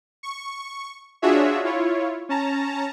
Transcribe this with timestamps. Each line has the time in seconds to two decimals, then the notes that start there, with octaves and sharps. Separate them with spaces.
0.23 C#6
1.22 D4 F4 F#4 G#4 C#5 E5
1.64 E4 F4 C#5
2.29 C#4 A5 A#5